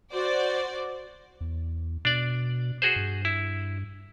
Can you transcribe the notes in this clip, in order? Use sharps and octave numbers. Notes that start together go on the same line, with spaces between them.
F#4 C5 D5
E2
B2 D4 D5
F#4 G#4 C5
G2
E4